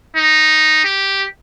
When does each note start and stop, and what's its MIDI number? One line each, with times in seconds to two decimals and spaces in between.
0.17 0.84 63
0.85 1.25 67